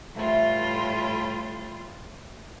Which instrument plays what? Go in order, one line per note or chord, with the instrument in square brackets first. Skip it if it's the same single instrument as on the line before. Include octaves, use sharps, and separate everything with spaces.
[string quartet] A2 G3 F4 [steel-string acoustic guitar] E3 A3